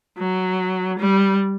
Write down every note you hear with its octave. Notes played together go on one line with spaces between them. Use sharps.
F#3
G3